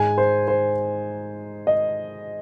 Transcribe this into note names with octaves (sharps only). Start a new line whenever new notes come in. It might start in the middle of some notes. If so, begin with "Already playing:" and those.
Already playing: G#2 G#3 D#4 G#5
C5
C5
D#5